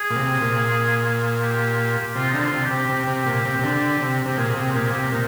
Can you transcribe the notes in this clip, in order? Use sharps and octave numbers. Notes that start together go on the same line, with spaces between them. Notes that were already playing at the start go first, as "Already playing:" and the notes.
Already playing: G#4
A#2
C3
A#2
G4
C3 F4
D3 D#4
F4
C3
G4
C3
C3
C3
A#2
C3
C3
D3
C3
C3 G4
A#2 G#4
C3
A#2 G4
C3
A#2 D#4